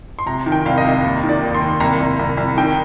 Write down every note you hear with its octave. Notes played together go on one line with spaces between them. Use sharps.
C6
C3 A#5
D#3
G5
C2 F5
D#5
C3
D#2
D#3
D5
D#2
C6
D#2
C2 A#5
C2
C2
C2
D#3 G5